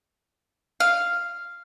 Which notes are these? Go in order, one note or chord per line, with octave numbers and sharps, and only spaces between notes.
F5